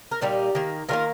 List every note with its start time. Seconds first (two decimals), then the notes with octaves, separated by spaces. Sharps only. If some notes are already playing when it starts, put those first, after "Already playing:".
0.11 A#4
0.21 A#2 G3 A#3 D#4 G4
0.55 D#3 A#3
0.89 D#3 G3 A#3 F4 A#4